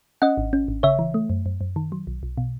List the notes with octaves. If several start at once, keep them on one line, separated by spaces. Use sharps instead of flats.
C#4 D#5 F#5
G#1
C#4
G#1
C#3 C#5 E5
E3
A3
F#2
F#2
F#2
D#3
F#3
B1
B1
B2